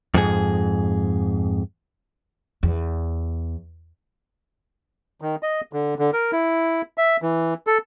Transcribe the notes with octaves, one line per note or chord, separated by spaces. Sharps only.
F2 G#2 G#4
E2
D#3
D#5
D3
D3
A#4
E4
E5
E3
A4